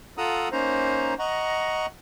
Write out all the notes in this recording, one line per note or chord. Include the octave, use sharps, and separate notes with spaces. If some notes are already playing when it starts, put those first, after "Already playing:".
F4 A4 F#5 A#5 D#6 E6
A#3 C#4 D#4 C5 A#5
D#5 F#5 A#5 C#6